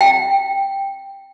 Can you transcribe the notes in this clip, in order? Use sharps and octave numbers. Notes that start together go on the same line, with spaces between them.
G5